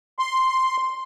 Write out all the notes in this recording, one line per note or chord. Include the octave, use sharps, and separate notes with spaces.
C6